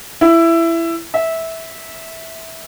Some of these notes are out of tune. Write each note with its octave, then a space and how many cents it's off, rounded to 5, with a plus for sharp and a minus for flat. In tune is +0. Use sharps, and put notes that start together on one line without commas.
E4 +15
E5 -15